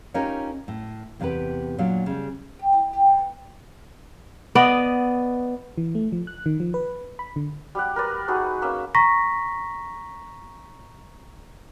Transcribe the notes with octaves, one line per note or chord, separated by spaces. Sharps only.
C#4 D#4 F4 G4 A#4 C#5
A2
E2 C3 F4 G4 B4
A#2 F#3 D4 F4
C#3 G3
G4
E4
G4
A2
B3
B3 D5 D#5
E3
A3
F3
F#6
D#3
F3
B4
B5
D3
G3 G4 F#5
A#4 B4 D5 A#5
D#4 F#4 G#4 B4
A#3 C#4 E5
A#5 C#6 A#6 B6